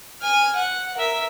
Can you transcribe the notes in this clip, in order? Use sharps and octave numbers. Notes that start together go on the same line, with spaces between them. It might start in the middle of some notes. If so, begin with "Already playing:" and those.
G#5 F6
F#5
A#4 E5